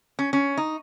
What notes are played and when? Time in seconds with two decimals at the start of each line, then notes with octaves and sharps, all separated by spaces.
0.19 C#4
0.33 C#4
0.57 D#4